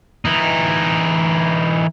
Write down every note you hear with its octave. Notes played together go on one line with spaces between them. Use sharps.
E3 D#4